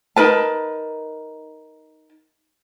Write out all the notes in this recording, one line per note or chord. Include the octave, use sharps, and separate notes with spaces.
D#4 A#4 B4 A5